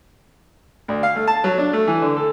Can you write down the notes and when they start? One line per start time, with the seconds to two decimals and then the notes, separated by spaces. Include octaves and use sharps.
0.88 D2
1.03 F5
1.16 A3
1.27 A5
1.44 F#3
1.58 D4
1.73 A3
1.87 E3
2.02 D3
2.17 A4